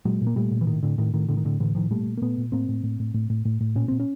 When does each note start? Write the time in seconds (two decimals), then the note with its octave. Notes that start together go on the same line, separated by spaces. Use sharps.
0.05 A#2 F#3 G#3
0.22 A#2
0.27 A#3
0.36 A#2 G3 A3
0.51 A#2
0.61 E3
0.67 A2 D#3
0.83 A2 D3
0.98 A2 D#3
1.14 A2 D#3
1.29 A2 D3
1.37 D#3
1.45 A2 D3
1.60 A2 D3 E3
1.75 A2 D#3 F3
1.90 A#2 G3 A3
2.06 A#2
2.17 A#3
2.22 A#2 A3 B3
2.38 A#2
2.52 A2 A#3 C4
2.69 A2
2.83 A2
3.00 A2
3.14 A2
3.30 A2
3.45 A2
3.61 A2
3.75 A#2 C#4
3.88 A#2 C4
4.00 C#4